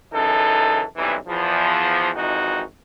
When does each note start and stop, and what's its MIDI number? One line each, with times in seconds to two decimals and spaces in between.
0.13 0.83 42
0.13 0.83 49
0.13 0.83 52
0.13 0.83 63
0.13 0.83 69
0.96 1.15 35
0.96 1.15 43
0.96 1.15 48
0.96 1.15 52
1.27 2.09 40
1.27 2.09 53
2.15 2.62 32
2.15 2.62 41
2.15 2.62 52
2.15 2.62 63
2.15 2.62 66